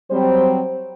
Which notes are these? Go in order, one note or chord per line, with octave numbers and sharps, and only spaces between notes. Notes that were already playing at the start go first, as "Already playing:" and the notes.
F#3 G3 C4 C5